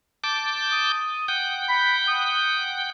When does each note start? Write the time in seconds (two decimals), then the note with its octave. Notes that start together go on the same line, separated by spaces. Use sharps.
0.24 A5 D6 G6
0.72 D#6
1.28 F#5 G5 G6
1.69 B5
2.08 D#6